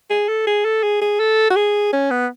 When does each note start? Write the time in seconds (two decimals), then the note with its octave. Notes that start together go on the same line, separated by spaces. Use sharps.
0.10 G#4
0.28 A4
0.47 G#4
0.65 A4
0.83 G#4
1.02 G#4
1.20 A4
1.50 F#4
1.56 G#4
1.93 C#4
2.10 B3